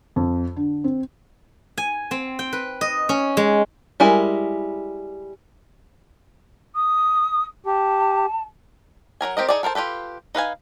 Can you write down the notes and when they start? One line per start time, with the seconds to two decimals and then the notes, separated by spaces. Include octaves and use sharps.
0.16 F2
0.56 D3
0.84 C4
1.78 G#5
2.11 C4
2.39 G5
2.53 B4
2.81 D#5
3.09 C#4
3.37 G#3
4.00 G3 G#3 E4 A#4 G#5
6.75 D#6
7.66 G4 A5
9.21 F#3 G#4 A#4 G#5
9.37 C4 G4 A#4 D#5
9.48 D#4 F4 G#4 A4 D5
9.63 A4 A#4 C5 A5
9.75 F4 G4 A4 B4
10.35 D#4 B4 F5 G#5